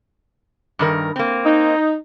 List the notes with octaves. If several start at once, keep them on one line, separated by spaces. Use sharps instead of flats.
G2 D#3 A#4
A#3 C4
D#4